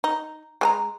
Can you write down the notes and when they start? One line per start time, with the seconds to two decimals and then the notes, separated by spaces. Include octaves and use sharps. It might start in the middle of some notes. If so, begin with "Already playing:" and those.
0.04 D#4
0.61 G#3 G#5 A#5